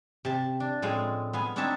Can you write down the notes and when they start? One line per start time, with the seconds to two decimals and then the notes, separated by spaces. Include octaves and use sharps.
0.25 C3 A5
0.60 D4
0.82 A2 F3 G#3 C4 F5 G#5
1.33 B3 F5 G#5
1.56 C4 D4 D#4 C#5 E5 A5